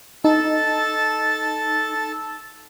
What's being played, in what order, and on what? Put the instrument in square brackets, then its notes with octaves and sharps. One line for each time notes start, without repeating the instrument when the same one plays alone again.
[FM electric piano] D#4 [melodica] A4 A5